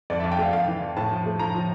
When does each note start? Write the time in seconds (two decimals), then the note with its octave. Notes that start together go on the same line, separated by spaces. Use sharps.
0.10 F2 D5
0.20 F2 E5
0.32 G5
0.38 A3 F5
0.53 F2 F5
0.67 E3
0.82 F2
0.96 A2 A5
1.11 F3
1.26 A3
1.39 F3 A#5
1.54 F3